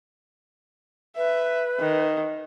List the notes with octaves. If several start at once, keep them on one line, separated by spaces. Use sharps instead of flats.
B4 E5
D#3